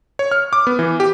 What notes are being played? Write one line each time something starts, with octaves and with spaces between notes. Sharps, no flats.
C#5
F6
D6
B3
E3
G4